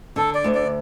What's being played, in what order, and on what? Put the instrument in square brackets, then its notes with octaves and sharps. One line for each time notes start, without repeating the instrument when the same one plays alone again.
[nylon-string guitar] D3 [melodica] A4
[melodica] D5
[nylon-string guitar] D2
[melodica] D5